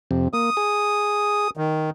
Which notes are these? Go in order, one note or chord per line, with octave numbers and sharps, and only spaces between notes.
F2 C3
A#3 D#6
G#4
D#3